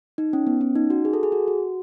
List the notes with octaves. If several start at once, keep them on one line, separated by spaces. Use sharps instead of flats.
D#4
C#4
B3
C#4
D#4
F#4
G#4
A4
G#4
F#4
F#4